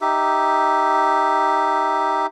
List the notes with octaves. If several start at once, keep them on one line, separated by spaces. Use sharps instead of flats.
D#4 G4 E5